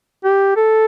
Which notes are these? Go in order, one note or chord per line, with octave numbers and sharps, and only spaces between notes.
G4
A4